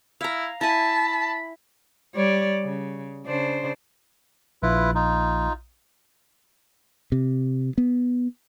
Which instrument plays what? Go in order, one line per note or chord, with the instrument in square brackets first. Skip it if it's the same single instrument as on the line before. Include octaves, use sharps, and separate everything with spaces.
[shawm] E4 [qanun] F5 A#5
[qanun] E4 G#5 [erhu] A5 [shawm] B5
[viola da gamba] G3 C#5 D5
C#3
C#3 D4 C5
[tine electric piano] A#1 [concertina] E4 F4 B4
[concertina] D#4 F4
[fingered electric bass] C3
B3